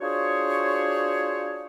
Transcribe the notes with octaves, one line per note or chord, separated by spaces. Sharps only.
D4 F4 F#4 G#4 C5 C#5